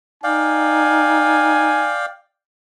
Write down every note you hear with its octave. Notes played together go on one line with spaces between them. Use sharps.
D#4 D5 F5 G5 G#5